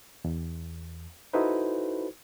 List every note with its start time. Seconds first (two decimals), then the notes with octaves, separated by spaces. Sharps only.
0.25 E2
1.33 D#4 E4 F#4 A4 B4 C5